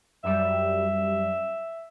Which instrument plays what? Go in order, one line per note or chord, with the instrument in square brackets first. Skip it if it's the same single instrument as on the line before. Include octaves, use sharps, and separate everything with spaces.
[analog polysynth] F#2 G3 [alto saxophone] E5